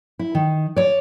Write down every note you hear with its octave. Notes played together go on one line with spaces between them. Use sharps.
E4
D#3
C#5 D5